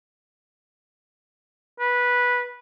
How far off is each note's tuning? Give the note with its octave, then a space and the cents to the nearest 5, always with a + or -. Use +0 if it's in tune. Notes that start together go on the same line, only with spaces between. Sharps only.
B4 -10